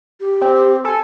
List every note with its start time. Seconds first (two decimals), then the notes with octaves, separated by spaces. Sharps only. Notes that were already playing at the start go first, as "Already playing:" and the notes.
0.20 G4
0.41 C4
0.84 A4 G#5